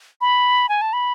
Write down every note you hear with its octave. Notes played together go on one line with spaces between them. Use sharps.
B5
G#5
A5
B5